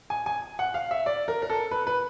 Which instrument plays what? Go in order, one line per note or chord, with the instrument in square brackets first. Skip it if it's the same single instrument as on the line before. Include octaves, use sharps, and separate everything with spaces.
[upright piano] G#5
G#5
F#5
F5
E5
D5
A#4
A#4
A4
B4
B4